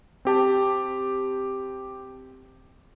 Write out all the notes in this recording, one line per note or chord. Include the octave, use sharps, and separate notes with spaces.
C4 G4 A5